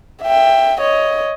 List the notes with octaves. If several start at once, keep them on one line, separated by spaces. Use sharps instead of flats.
E5 G5
C#5 D#5